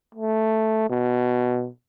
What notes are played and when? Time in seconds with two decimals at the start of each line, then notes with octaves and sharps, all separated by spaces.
0.15 A3
0.90 B2